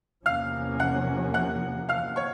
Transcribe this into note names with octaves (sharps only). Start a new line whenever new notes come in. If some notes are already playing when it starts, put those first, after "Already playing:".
E2 C3 F3 A#3 C#4 F5 F6
F#5 F#6
F#5 F#6
F5 F6
C#5 C#6